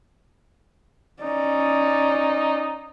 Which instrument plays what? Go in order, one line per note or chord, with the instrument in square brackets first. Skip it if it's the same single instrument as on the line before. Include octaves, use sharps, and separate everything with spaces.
[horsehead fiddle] C#4 D5 [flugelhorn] D#4